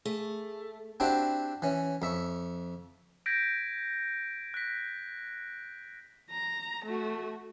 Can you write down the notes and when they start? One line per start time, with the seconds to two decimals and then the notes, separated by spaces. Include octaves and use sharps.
0.05 A3 G#4
1.00 C4 D4 E4 F#4 G4
1.62 E3 C#4
2.02 F2 E5 C#6
3.26 G6 G#6 A#6 B6 D7
4.54 F#6 A#6 B6
6.30 A#5
6.85 A3 F#4